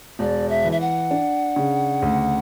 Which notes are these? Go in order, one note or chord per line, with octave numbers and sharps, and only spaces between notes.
E1 D5
E5
E3
E5
F#5
D4
C#3
D2